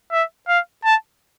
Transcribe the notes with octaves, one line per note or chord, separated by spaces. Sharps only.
E5
F5
A5